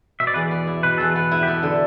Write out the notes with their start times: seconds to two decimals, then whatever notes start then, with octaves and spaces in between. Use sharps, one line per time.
0.20 B2 E5
0.27 D5
0.34 E2 B4
0.41 D5
0.51 B3
0.67 E4
0.83 B2 B4
0.98 E2 A4
1.11 B3 B4
1.31 E4
1.43 G4
1.47 B3 A4
1.63 D3